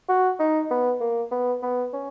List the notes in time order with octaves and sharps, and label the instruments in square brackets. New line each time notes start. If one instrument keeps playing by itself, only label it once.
[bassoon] F#4
D#4
B3
A#3
B3
B3
C#4